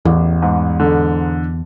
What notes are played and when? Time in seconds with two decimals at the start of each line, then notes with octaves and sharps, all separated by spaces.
0.05 A1 E2
0.42 G#2
0.80 D3